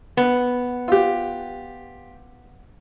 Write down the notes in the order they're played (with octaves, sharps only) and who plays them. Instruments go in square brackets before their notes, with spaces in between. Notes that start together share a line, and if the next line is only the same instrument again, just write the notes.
[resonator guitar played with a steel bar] B3
[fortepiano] F4 G4